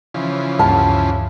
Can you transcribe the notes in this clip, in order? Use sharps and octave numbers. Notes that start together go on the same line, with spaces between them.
C#3 E3 F3
D2 G2 A5